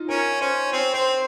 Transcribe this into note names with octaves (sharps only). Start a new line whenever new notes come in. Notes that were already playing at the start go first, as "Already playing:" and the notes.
Already playing: D#4 F4
C#4 A#4
C#4 C5
C4 C#5
C4 C5